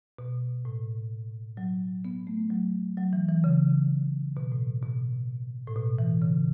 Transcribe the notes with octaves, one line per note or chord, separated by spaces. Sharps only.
B2
A2
F#3
B3
A3
F#3
F#3
E3
E3
C#3
B2
A2
B2
A2
B2
E3
C#3